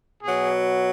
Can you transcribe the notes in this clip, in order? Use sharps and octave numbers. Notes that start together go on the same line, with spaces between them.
B2 F#3 G#4